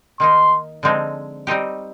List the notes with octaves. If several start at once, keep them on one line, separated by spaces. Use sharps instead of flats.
D#3 A#3 D#4 C6
D3 F3 G#3 C4 D#4
G3 C4 D#4 G4